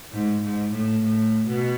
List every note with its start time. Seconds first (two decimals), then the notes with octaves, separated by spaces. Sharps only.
0.12 G#2
0.42 G#2
0.72 A2
1.02 A2
1.47 B2